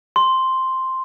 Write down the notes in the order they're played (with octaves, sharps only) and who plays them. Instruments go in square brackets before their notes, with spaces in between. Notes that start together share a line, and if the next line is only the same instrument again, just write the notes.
[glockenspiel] C6